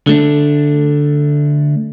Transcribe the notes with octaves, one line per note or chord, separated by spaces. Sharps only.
D3 A3 D4